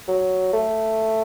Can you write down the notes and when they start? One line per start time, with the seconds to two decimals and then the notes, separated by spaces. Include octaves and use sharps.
0.08 F#3
0.53 A3